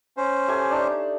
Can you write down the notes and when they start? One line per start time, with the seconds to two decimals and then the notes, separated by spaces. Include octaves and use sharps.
0.17 C#4 C5
0.48 A3 G4 G#5
0.70 D4 D#4 A5